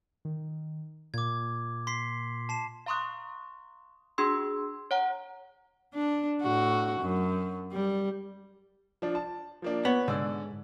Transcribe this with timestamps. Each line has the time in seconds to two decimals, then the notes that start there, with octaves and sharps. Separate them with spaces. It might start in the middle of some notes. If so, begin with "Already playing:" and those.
0.25 D#3
1.14 A#2 D6 G#6
1.87 C6 B6 C7
2.49 A5 C7 E7
2.86 F5 A#5 C6 C#6 D#6 F#6
4.18 D4 F#4 G#4 C6 E6
4.91 C#5 F#5 A#5
5.94 D4
6.41 A2 F#4
7.00 F#2
7.72 G3
9.02 F3 D4
9.15 A5
9.62 F3 A#3 D4
9.85 B3 C#5
10.08 G#2 D3 D5 E6